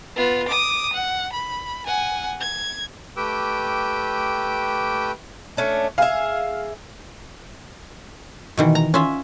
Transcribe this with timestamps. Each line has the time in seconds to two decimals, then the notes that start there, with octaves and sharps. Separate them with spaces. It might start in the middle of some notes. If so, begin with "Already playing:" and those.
0.16 B3 F4
0.48 D6 D#6
0.93 F#5
1.33 B5
1.86 F#5 G#5
2.41 G#6
3.17 A3 G4 B4 G5 D6 E6
5.57 A3 C#4 D4
5.98 G#4 E5 F5
8.57 B2 D#3 E3
8.75 A#5
8.94 C#4 F4 E5